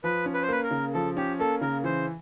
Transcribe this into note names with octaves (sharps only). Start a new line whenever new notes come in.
F3 B4
C#4
B4
C5
A#3 B4
A#4
C#3
F3 A4
C#4 G4
A#3 A4
C#3 A#4
E3 C5